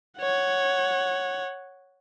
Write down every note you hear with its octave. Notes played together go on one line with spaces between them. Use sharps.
C#5 F#5